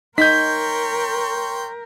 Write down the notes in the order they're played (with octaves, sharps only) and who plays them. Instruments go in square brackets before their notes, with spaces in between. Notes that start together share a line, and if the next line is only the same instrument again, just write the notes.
[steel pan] D#4 [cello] A#4 [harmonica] C#5 G5 C6 [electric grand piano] G6 B6